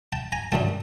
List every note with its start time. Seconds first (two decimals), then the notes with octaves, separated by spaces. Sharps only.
0.13 G5 A5
0.32 G#5 A#5
0.52 F#2 D3 F#3 A3 G5 A5